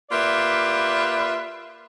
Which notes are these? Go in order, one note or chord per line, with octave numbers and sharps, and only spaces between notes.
A#3 F4 G4 B4 D5 E5